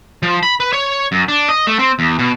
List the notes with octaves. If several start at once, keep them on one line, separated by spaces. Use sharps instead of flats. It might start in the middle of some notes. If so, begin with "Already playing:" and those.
F3
B5
B4
C#5
F#2
D4
D#5
A3
C4
E2
B2